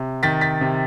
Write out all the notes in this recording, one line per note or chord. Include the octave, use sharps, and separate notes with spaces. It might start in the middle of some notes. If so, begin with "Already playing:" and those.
Already playing: C3
D#3 A6 B6
A6 B6
C3